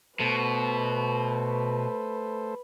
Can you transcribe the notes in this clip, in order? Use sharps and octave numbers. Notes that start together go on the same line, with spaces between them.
B2 A3 A4 B4 C5